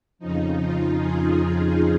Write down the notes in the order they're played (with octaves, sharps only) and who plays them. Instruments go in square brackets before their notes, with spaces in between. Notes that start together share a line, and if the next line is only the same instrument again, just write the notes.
[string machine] F2 C#3 F3 D#4
F4
G#4